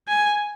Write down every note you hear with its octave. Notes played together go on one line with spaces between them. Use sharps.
G#5